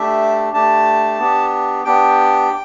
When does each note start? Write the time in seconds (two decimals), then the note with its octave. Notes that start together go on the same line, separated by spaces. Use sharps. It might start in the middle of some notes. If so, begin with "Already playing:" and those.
Already playing: A3 D4 G4 E5
0.53 A3 D4 G4 A5
1.19 B3 D4 G4
1.85 B3 D4 G4 G5